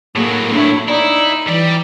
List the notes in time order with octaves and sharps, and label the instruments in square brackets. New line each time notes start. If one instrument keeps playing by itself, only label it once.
[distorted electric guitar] A2 F#3 [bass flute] A#3 [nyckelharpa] G#4
[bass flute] D4 [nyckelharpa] E4 C#5
[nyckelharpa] D#4 [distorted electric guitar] E4 [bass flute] D5
[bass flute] E3 [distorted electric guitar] G3 D5